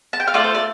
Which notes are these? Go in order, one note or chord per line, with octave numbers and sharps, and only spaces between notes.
A5
G5
F5
A3 F4 A4 D5
C5
D5